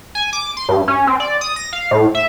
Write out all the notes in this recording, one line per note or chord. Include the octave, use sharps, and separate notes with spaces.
G#5
D6
C6
G2
C#4
C4
D5
D#6
A#6
F5
A2
E5